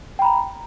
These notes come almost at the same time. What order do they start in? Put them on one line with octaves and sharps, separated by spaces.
G5 B5 A#5